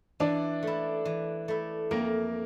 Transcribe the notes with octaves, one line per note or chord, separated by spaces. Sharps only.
E3 D4 D5
A3 E4
E3
A3 E4
F2 A#3 A#4